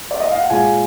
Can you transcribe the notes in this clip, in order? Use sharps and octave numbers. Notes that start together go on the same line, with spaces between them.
D5
D#5
F5
F#5
A#2 G#3 F5 G#5